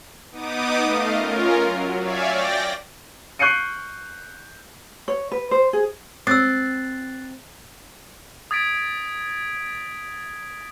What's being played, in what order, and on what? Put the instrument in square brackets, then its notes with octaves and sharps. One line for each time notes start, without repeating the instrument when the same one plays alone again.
[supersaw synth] B3 D#4 D6 D#6
A3 D#5 F5
C#4 F4 A#4
F#3
C#5 D5 E5 F5 G#5
D5 G5 A#6
[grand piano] C#6 F#6 G6 C7 C#7 D#7
[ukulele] C#5
B4
C5
G#4
[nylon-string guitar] C4 [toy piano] D#6 E6 [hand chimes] F#6 A6 C7
[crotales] D#6 G#6 A6 B6 D7